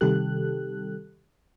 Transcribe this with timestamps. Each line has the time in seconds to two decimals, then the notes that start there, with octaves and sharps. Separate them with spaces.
0.01 C3 D#3 G3 G4 A4 F#6